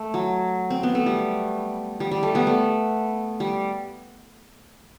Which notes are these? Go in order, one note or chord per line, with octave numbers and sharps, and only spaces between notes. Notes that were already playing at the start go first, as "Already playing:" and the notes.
Already playing: A3
F#3
C4
B3
A3
G3
G3
G3
A3
G3 B3
A3
G3